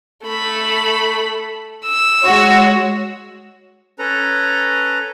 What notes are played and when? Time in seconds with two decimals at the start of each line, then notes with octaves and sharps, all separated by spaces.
0.26 A3 B5
1.85 E6
2.22 G#3 F#4 C#5
3.99 C#4 A4 B4 A#5